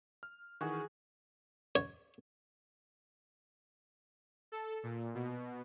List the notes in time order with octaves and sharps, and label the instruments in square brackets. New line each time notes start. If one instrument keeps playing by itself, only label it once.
[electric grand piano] F6
[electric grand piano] D#3 E3 [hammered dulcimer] F#4 G#4
[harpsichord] C#5
[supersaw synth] A4
A#2
B2